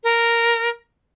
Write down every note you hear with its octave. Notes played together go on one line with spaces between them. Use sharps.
A#4